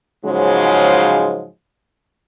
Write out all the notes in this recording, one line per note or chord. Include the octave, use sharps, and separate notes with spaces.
G#2 C#3 F3 F#3 G#3